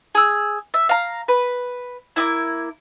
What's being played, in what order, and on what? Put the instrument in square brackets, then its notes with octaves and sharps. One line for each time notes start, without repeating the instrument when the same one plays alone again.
[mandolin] G#4 E6
E5
F5 A#5
B4
A#3 B3 E4